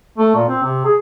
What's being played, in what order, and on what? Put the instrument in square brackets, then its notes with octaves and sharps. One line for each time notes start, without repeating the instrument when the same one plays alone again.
[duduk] A3
A#2
C4
C3
G#4